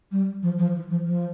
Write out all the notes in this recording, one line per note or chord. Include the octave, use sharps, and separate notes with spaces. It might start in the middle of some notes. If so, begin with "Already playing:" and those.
G3
F3
F3
E3
F3
F3